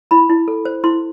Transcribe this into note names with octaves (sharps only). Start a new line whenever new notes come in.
E4 B5
E4
A4
C5
E4 C6